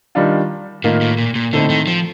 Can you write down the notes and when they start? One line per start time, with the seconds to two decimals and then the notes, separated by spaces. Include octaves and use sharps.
0.15 D#3 G3 D4 F4
0.84 A2 D#3 A#3 F4 A#4
1.01 A2
1.18 A#2
1.35 A#2
1.53 A2 D3 A3 C4 D#4
1.70 D#3
1.87 F3